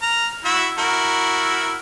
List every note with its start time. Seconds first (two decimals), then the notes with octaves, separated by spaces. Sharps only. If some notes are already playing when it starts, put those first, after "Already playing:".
0.02 A#5 F6
0.45 E4 F#4 E5
0.78 E4 F#4 A#4